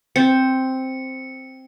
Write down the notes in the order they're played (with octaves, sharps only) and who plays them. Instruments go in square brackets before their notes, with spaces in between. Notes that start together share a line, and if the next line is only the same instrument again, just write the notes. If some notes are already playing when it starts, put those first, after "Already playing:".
[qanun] C4 [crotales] C#7